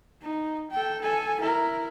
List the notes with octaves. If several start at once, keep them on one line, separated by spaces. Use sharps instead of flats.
D#4
A4 G5
A4 G#5
E4 A#4